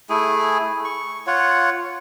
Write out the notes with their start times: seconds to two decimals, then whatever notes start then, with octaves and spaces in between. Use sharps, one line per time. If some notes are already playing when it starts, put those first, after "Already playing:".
0.10 A3 E4 G#4 G#5
0.85 C#6
1.27 F4 C#5 F#5